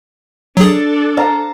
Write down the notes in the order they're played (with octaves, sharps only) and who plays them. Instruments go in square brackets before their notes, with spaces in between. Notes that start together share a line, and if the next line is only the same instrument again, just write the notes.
[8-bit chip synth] F#3 G#4 [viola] D4 A4
[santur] F5 A5 A#5